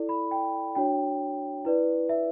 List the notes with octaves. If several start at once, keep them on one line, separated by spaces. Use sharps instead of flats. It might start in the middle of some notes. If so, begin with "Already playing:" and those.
Already playing: E4 A4 D5
B5
G5
D4 F#4 C#5 G5
E4 B4 D5
E5